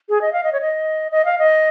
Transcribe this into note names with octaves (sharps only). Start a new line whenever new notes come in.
G#4
D#5
F5
D#5
C#5
D#5
D#5
F5
D#5